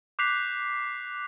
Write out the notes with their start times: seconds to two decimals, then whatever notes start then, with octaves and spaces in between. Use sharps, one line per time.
0.19 D6 F#6 G6 B6 C7 F7